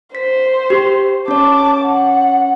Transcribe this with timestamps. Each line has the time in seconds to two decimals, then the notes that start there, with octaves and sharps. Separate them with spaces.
0.15 C5 B6
0.70 G4
1.28 C#4 C#5 A5 D6
1.85 F#5